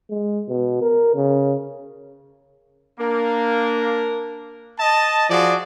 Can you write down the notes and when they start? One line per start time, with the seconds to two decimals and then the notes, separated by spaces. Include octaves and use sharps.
0.10 G#3
0.49 B2
0.82 A#4
1.15 C#3
2.99 A#3 D4 A#4
4.79 D#5 A5
5.29 F3 F#4 G#4 D5